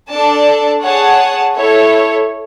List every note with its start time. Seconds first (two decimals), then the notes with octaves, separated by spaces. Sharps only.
0.10 D4 A4 D5 A5
0.82 G#4 C#5 F#5 A5
1.54 E4 A4 C#5